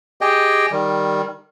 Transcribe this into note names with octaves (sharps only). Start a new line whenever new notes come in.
G4 G#4 D#5 G5
D#3 G3